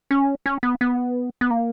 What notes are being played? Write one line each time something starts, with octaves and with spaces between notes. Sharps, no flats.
C#4
C#4
B3
B3
B3
A#3